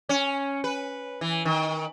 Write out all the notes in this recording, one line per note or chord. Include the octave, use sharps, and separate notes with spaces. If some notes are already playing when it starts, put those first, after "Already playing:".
C#4
B4
E3
D#3